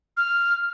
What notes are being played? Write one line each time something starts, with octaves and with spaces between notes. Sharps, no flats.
F6